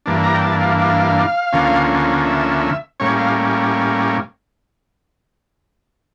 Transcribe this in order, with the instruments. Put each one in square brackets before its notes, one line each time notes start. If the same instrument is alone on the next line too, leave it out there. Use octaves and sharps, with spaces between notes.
[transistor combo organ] G2 E3 A#3 D4
A#5
G5
A5
F5
F5
D2 D3 F3 A#3 C#4
E5
A2 G3 A#3 C#4 C#5
F5